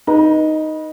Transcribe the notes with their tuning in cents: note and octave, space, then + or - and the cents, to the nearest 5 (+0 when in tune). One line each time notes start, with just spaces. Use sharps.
D#4 +0 B4 -30